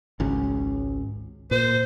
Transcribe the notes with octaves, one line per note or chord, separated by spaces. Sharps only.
G#1 C#2 C#4
A#2 C5